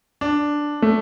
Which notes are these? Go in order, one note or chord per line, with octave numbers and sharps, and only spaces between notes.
D4
A3